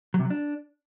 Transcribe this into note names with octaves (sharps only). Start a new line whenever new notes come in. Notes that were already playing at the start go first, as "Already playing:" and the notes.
F#3
C3
F#3
D4